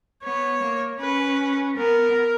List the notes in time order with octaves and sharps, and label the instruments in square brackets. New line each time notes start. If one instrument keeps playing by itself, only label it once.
[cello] B3 [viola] C#5
[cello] A#3
[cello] C#4 [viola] B4
[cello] B3 [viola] A#4